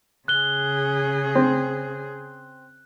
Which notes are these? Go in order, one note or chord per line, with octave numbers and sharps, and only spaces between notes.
C#3 G#4 F#6 G7
C4